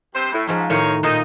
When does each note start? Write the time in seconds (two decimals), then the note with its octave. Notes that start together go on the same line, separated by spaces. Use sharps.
0.14 G2 C3 C5
0.32 A2
0.47 G#2 F3 C#4 D#4
0.70 A2 D#3 F3 D#4 C#5
1.03 A#2 D#4 C5 A5